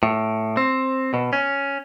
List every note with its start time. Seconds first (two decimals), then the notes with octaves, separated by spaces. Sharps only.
0.03 A2
0.57 C4
1.14 B2
1.33 C#4